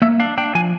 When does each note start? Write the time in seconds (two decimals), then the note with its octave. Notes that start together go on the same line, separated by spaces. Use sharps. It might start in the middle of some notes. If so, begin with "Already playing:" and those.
0.02 A#3 E5
0.20 D4 F5
0.38 D4 G5
0.55 F3 G#5